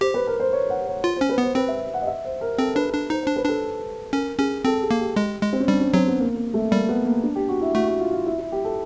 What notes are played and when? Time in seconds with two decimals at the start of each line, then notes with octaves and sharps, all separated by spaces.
0.01 G4 C5
0.14 B4
0.27 A#4
0.40 C5
0.53 C#5
0.70 F#5
0.87 C#5
1.04 F4
1.16 C#4 C5
1.29 B4
1.38 B3 C5
1.55 C4 B4
1.68 E5
1.94 F#5
2.02 D#5
2.07 E5
2.25 C5
2.41 A#4
2.58 C4 A4
2.75 D4 B4
2.93 D4
3.10 D#4 C5
3.23 D4 C5
3.36 B4
3.45 D4 A4
4.13 C#4 A#4
4.39 C#4 G#4
4.65 C4 A4
4.82 G#4
4.91 A#3
5.00 G4
5.16 G#3
5.42 G#3
5.53 C4
5.60 C#4
5.68 G3 D4
5.81 C#4
5.94 F#3 C4
6.07 B3
6.20 A#3
6.37 A#3
6.54 A3
6.71 G3 A#3
6.89 B3
7.05 A#3
7.23 D4
7.35 G4
7.49 F#4
7.61 E4
7.75 A3 F#4
7.88 F#4
8.01 F4
8.13 F4
8.26 E4
8.39 E4
8.52 G4
8.65 A4